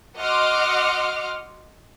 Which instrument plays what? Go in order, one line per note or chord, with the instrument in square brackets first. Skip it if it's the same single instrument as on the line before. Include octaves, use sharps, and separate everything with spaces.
[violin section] F#4 D#5 F#5 C6 D6 F6